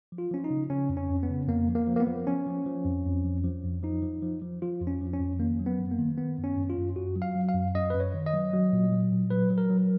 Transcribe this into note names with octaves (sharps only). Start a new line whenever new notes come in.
F3
F4
F3 C#4
D#4
C#3
C#3 C#4
F2
C#4
F2
B3
C#3
F2 A#3
F3
A#3
F3
A#3
B3
F3
F3 C#4
F3
F3
F2
F2
F3
F3
F2
F3 D#4
F3
F3
F3
F3 F4
F2
C#4
F3
C#4
F2
D#3 A#3
F#3
B3
F#2
A#3
D#3
D#3 B3
F#2
C#4
F#2
F4
F#2
F#2 F#4
F#3
F5
F#3
F5
F#2
F#2 D#5
F#2 B4
C#5
D#3
D#5
F#3
F#3
A#2
F#3
A#2
F#3 B4
F#3
A#4
F#3